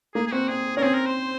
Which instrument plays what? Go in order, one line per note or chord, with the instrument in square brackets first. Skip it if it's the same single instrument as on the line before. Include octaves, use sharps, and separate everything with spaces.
[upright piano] A#3 [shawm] G#4
[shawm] G#4
[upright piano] C4 [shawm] F#4
[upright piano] C4 [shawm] G#4
[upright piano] C#4 [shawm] A#4
[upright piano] C4 [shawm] G#4
[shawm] A#4
C5